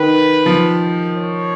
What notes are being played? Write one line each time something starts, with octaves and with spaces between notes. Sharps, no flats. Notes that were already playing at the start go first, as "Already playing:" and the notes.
Already playing: D#3 B4
F3
C#5